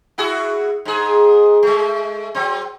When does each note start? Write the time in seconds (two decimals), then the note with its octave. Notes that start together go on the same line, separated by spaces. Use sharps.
0.18 E4 F#4 G#4
0.85 G#2 G#4
1.63 G#3 A3
2.35 F#3 C4